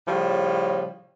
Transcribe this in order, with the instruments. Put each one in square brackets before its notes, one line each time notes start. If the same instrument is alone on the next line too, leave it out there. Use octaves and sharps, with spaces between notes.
[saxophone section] A2 C#3 F3 G3